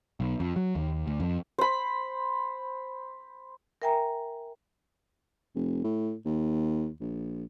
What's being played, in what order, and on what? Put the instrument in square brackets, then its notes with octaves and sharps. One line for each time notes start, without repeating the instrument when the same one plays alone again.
[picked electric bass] B1
F2
F#3
D#2
D2
F2
[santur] C5 B5
[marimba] A#4 E5 G5 G#5 A#5
[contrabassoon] F1
A2
D#2
A#1